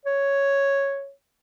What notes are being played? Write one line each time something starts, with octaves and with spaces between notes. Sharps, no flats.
C#5